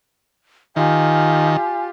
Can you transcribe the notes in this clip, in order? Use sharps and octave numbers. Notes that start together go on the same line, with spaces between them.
D#3 F4 G4 G#5